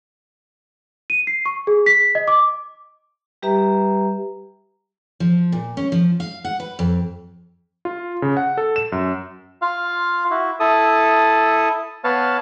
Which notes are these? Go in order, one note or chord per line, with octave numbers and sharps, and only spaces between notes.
D#7
C7
C#6
G#4
B6
D#5
D6
G3 G4 B4 E5 A#5
F3
A#2
C#4
F3
F5
F#5
B4
F2
F4
C#3
F#5
A4
E7
F#2
F4 F5
E4 F#4
E4 A4 D#6
B3 B4 C#5 F5 A5